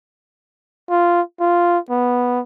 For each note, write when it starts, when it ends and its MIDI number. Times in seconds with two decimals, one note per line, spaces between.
0.90 1.21 65
1.40 1.79 65
1.90 2.41 59